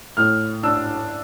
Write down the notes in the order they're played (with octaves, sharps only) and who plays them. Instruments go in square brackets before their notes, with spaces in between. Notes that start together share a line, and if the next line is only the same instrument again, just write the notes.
[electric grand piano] A2 [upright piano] F6
[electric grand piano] D4 [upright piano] E6